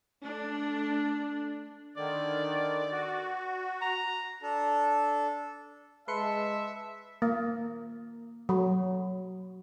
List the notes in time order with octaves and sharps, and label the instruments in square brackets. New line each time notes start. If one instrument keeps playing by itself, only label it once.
[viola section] A3 D4
[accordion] D3 D#3 [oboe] D5
[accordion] F#4
[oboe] A#5
[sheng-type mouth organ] D4 A4
[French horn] G#3 [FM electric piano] B4 C6 C#7 [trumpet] E5 [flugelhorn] A5
[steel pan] A#3
F#3